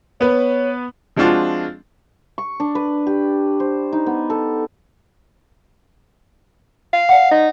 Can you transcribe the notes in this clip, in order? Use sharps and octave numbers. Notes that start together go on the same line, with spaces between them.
B3 B4 C#5
F3 G#3 C4 D4 F4 F#4
C#6
D4
B4
G4
C5
D#4
B3
A4
F5
D5 F#5
D#4